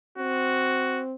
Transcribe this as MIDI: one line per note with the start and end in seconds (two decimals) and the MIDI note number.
0.18 1.15 60
0.18 1.03 66